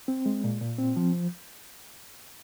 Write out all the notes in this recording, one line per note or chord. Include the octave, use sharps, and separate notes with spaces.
C4
G#3
A#2
A#2
C4
F3